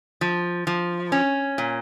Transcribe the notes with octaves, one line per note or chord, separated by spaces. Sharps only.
F3
F3
C#4
A#2